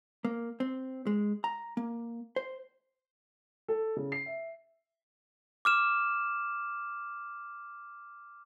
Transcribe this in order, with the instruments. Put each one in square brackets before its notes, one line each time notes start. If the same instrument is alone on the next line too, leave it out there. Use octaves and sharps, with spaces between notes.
[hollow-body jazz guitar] A#3
C4
G#3
A#5
A#3
C5
[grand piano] A4
C#3
C7
E5
[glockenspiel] D6 F6 E7